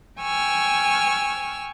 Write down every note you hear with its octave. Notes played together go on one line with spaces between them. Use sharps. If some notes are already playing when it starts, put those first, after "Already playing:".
G5 G#5 C#6 E6 F6